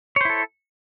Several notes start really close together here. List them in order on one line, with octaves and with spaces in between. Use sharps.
C#5 C5 E4 A4